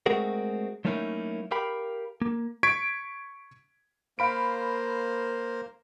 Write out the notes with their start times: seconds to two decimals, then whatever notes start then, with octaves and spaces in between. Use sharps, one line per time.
0.06 G#3 A3 C4 F#4 G#4 A#4
0.85 F#3 A3 A#3 C#4 D#4 E4
1.51 G4 A#4 F5 G5 B5
2.22 A#3
2.63 C#6 G#6 B6 D7
4.19 A#3 A#4 C5 F5 B5 D7